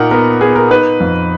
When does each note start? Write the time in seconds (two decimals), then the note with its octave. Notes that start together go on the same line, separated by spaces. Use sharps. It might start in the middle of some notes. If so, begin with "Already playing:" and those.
Already playing: A#2 D#4 A#4 F#5
0.11 B3 A#4
0.41 B3 G#4
0.56 A#4
0.71 D#4 B4
1.00 F2